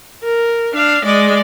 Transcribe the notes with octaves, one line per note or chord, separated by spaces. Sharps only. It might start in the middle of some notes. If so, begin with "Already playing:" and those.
A#4
D4 F5
G#3 D5